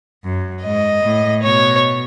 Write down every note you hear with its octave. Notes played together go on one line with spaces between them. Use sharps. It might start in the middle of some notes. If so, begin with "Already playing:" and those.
F#2
G#2 D#5
A2
B2 C#5